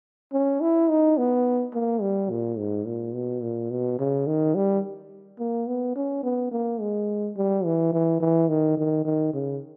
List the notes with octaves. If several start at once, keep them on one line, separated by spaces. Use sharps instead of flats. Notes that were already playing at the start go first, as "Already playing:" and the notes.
C#4
E4
D#4
B3
A#3
G3
A#2
G#2
A#2
B2
A#2
B2
C#3
D#3
G3
A#3
B3
C#4
B3
A#3
G#3
G3
E3
E3
E3
D#3
D#3
D#3
C#3